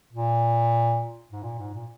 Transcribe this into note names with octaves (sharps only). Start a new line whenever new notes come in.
A#2
G#2
A#2
G#2
A#2